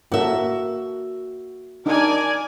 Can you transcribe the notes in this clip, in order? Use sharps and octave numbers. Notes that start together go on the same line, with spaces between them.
A#3 F#4 A4 E5
D4 D#4 A#4 D5 G#5